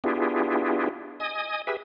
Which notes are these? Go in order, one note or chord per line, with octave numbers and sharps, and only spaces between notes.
B3 D4 E4 F4 G4 G#4
D#5 G#5 D#6
G4 G#4 B4 E5